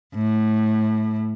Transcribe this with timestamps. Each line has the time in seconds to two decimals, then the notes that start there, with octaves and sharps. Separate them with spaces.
0.14 A2